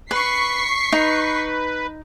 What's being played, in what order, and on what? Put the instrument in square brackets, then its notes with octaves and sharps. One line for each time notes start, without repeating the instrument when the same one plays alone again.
[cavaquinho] B4 [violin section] C#6 B6 C7
[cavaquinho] D#4 [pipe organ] B4